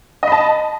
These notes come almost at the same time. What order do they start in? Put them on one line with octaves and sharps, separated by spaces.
D#5 B5 A5